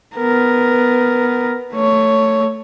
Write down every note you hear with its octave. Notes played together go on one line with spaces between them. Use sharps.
B3 A#4
A3 C#5